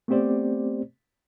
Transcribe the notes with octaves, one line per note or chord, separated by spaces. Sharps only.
A3 B3 C4 G4 C5 D5